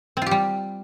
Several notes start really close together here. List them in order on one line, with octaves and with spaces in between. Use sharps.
C4 F4 G4 G3